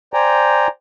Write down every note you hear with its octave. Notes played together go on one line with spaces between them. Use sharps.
C5 D5 G5 G#5 A#5